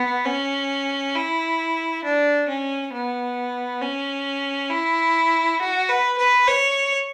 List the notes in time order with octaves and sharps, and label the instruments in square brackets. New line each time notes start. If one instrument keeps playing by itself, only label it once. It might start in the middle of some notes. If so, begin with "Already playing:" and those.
Already playing: [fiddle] B3
C#4
E4
D4
C#4
B3
C#4
E4
F#4
B4
B4
C#5